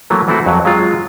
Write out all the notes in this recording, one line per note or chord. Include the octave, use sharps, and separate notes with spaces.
E3 F#3 A3 A#3
E3 A3 C4 E4 F#4
F2 F#3
F#3 G#3 C4 F4